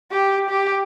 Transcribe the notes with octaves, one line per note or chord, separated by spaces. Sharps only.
G4
G4